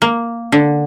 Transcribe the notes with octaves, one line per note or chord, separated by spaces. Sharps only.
A#3
D3